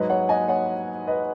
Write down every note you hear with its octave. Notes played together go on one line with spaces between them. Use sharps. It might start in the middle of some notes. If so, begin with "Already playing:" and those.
Already playing: G#2 F#3 B4 D#5
C#5 F#5
D#5 G#5
C#5 F#5
B4 D#5